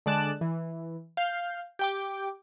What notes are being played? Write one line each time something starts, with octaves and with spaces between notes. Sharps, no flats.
D3 G#3 D5 A5 F#6 E7
E3
F5 G6
G4 G5 D6